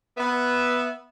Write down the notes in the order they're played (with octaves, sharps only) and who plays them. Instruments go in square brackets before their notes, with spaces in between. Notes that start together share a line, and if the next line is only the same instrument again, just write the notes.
[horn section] B3 E5